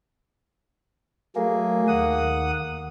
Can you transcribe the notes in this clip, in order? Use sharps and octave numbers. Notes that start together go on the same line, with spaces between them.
F#3 A3 A#3 G#4
D#2 F#5 D#6